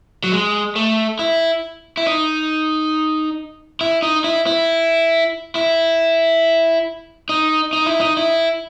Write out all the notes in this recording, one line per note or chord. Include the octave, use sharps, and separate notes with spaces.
F#3
G#3
A3
E4
E4
D#4
E4
D#4
E4
E4
E4
D#4
D#4
E4
D#4
E4